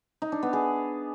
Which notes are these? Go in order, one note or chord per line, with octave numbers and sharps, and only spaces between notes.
D#4
D4
B3
G#4